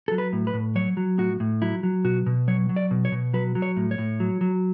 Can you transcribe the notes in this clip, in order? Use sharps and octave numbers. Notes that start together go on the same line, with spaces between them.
F#3 A4
B4
A2
B4
A2
F#3 C#5
F#3
A2 F#4
A2
F#3 E4
F#3
B2 F#4
B2
F#3 C#5
F#3
D5
B2
C#5
B2
F#3 B4
F#3
C#5
A2
C#5
A2
F#3
F#3